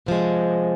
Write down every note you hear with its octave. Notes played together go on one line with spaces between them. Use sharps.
C3 F3 G#3